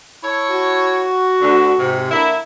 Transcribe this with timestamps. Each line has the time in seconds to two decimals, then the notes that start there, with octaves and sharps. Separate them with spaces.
0.23 E4 A4 C#5
0.51 F#4
1.42 D2 D3
1.79 G#2 C3
2.10 D3 A#3 E4